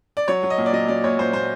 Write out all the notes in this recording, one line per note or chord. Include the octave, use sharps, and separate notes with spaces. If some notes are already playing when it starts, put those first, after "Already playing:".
D5
F#3 C#5
F#3
D#5
A#2
D5
F#3 D#5
F#3 D5
A#2 C#5
A#2 C5
A#2 C5